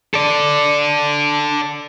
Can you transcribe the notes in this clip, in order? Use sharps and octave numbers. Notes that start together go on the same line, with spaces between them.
A4 D5